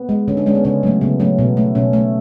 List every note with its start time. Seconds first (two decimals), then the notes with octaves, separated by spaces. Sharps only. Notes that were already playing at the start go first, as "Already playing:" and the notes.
Already playing: B3
0.09 G#3
0.28 D3 C#4
0.37 D4
0.46 G#3 C#4
0.55 B3
0.64 C#3 C#4
0.83 F#3 A3
1.01 C#3 B3
1.20 F#3 A3 C#4
1.39 B2 B3
1.57 A3
1.75 B2 C#4
1.93 A3